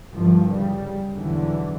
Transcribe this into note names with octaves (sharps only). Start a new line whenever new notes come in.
G1 C2 G2 F3
C#3 G3
B1 E2 D3 E3